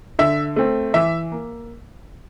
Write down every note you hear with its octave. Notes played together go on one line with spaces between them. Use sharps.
D3 E5
A3 C4
E3 E5
A#3